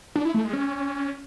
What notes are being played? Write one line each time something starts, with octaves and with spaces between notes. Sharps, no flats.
D4
E4
A3
G#3
C#4